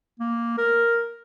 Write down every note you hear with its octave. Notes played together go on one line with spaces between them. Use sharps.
A#3
A#4